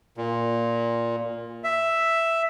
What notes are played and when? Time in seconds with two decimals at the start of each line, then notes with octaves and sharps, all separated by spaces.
0.17 A#2
1.64 E5